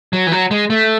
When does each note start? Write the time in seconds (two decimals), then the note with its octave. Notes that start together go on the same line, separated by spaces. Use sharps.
0.13 F#3
0.27 E3
0.32 F#3
0.51 G#3
0.70 A3